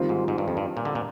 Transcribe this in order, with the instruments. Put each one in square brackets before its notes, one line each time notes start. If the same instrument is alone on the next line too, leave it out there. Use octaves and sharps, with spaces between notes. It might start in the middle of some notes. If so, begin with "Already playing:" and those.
Already playing: [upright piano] D#3 G3 C4 F4
[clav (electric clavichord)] G#2
G#2
G2
F2
G2
A#2
D3
A#2